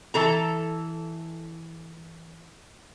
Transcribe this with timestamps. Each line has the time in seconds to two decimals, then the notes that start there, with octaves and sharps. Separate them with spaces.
0.14 E3 A4 A#5